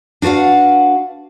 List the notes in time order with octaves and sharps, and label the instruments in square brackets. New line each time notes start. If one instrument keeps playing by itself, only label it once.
[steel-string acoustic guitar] D4 F#4 B4 F5 F#5